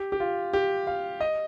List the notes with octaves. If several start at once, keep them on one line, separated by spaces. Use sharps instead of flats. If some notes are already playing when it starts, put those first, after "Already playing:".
Already playing: G4
G4
F4
G4
F5
D#5